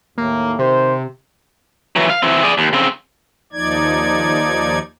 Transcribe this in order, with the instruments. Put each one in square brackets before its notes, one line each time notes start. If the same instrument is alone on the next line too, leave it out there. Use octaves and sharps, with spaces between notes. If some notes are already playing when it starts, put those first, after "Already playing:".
[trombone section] D#2 A2 [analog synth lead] A#3
[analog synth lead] C3 [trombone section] D#3 C4 C5
[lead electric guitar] E3 F#3
F5
E3 C4
G#4 D5
D#2
C#3 C4
[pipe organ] D#2 F3 D#4 D5 G#6